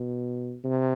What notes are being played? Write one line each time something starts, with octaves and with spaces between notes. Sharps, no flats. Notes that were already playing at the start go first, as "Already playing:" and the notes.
Already playing: B2
C3